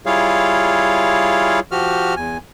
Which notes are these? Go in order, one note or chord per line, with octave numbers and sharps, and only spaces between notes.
G3 E4 F4 G#4 C#5 F5
F3 F#4 G4 F6
E2 G#5